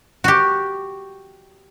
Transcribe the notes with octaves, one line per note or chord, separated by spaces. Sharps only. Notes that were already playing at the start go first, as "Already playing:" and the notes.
F#4 G4